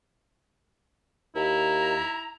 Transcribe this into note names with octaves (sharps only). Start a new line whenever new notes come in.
D#2 E4 A#5